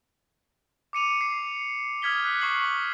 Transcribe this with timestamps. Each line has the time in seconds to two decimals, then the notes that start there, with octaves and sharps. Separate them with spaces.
0.93 D6 C#7 D#7 F7
1.21 C7
2.02 D#6 F6 G#6 B6 G7
2.24 F#6 B6
2.41 C#6 C7 F#7